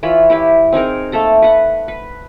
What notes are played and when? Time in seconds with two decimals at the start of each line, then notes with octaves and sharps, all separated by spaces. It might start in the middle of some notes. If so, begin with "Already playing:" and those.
0.03 E3 F4 C#5 B5
0.30 E4 G4 B4 B5
0.72 C4 D#4 G#4 A#4
1.12 A3 A#3 A4 A#5
1.42 B4 F#5
1.88 B4